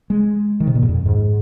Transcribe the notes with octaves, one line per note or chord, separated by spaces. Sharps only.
G#3
D#3
C3
A#2
G#2
F2
G#2